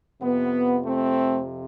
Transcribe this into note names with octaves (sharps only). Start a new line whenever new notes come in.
F2 C3 F3 B3
A3 C4